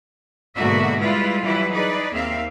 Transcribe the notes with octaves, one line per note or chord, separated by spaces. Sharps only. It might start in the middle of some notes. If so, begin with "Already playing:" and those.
G#2 B2 D3 A#3 F#4 E5
G3 G#3 E4 F4 B4
E3 F#3 G3 E4 B4
D#4 G#4 B4 D5
D#2 A#3 C4 E5 F5